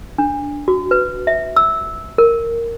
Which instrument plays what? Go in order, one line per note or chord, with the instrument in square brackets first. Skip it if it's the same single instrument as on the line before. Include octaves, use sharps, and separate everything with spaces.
[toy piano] D4
F#4
B4
E5
E6
A#4